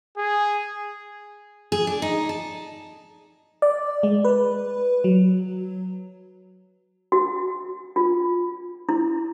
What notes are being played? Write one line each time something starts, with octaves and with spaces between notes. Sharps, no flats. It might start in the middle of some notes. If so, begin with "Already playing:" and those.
G#4
G#4
D4
D#4
A5
D5
G#3
B4
F#3
F#4
F4
E4